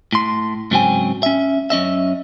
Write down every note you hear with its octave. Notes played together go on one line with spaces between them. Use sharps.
A2 C6
G#2 C#3 F#3 C4 G5 G#5
C#4 E5
F#2 C#4 D#5 E5